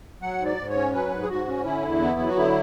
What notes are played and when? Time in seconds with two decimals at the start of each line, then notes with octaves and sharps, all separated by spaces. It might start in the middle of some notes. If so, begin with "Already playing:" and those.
0.21 F#3 F#5
0.39 G#2
0.45 D5
0.57 G#2
0.70 C#5
0.75 C#4
0.93 F#3 B4
1.11 G#2
1.22 G#4
1.29 G#2 F#4
1.47 C#4
1.64 D3 E4
1.82 E2
2.01 B3
2.19 F#3
2.28 F#4
2.36 D3 E4